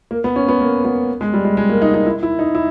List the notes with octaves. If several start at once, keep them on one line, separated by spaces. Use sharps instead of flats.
A#3
B3
C#4
B3
A#3
B3
G#3
G3
G#3
G#3
A#3
D#4
D#4
E4
E4
D#4
E4